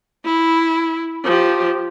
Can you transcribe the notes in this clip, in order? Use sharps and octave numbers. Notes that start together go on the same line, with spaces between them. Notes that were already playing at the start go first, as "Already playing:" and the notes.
E4
F3 G4